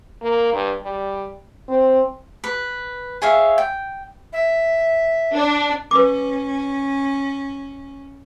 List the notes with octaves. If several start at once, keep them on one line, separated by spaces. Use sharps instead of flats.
A#3
G2
G3
C4
B4
G#4 C#5 E5 F5
G5
E5
D4
C#4 B4 D6